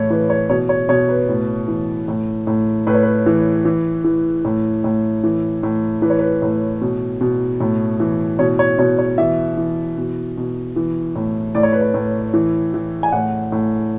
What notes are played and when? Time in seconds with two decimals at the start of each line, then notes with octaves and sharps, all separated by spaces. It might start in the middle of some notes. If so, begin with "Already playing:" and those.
Already playing: A2 E3 C#5
0.10 E3 B4
0.30 C#5
0.50 B2 C#5
0.69 C#5
0.89 B2 C#5
1.09 B4
1.28 A2
1.68 E3
2.08 A2
2.47 A2
2.87 A2 B4
2.94 C#5
3.03 B4
3.26 E3
3.65 E3
4.04 E3
4.45 A2
4.84 A2
5.24 E3
5.63 A2
6.02 E3 B4
6.10 C#5
6.19 B4
6.42 A2
6.81 B2
7.21 B2
7.60 A2
8.00 E3
8.39 B2 C#5
8.59 C#5
8.78 B2 C#5
8.99 C#5
9.18 E3 E5
9.57 E3
9.97 B2
10.37 B2
10.76 E3
11.15 A2
11.55 A2 D5
11.63 C#5
11.72 B4
11.81 C#5
11.94 A2
12.34 E3
12.74 E3
13.03 G#5
13.12 A2 F#5
13.52 A2